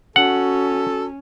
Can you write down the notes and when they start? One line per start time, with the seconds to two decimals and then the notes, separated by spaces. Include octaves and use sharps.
0.16 C#4 F#4 A4 F#5